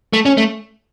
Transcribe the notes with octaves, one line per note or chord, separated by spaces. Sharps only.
A3
C#4
A3